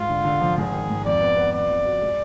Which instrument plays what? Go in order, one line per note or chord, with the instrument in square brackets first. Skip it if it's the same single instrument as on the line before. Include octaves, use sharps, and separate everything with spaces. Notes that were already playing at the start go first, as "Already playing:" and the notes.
Already playing: [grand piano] G#2 [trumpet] F4
[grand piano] D3
D3
F3
[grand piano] G#1 [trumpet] G#4
[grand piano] D#3
G#2
[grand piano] F2 [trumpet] D5
[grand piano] B3
B3
[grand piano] F2 [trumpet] D5
[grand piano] F2
F#3
G#3